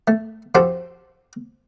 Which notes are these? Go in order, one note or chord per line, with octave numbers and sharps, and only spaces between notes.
A3
F3 C4 F#4 G4 A4 C5